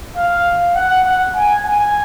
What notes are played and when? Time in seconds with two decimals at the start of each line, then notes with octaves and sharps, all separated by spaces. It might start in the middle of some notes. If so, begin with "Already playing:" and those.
0.16 F5
0.75 F#5
1.06 F#5
1.36 G#5
1.65 G#5